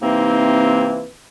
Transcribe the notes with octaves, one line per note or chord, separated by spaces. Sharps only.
C3 E3 A#3 C4 D#4